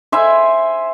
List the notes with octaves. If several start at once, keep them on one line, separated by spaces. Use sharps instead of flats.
C5 E5 G#5 B5